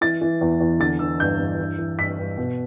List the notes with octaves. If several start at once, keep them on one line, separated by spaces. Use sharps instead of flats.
E3 A6
E3
E2
E2
D3 A6
D3 E6
G2 G6
G2
E3
E3
G2 B6
G2
B2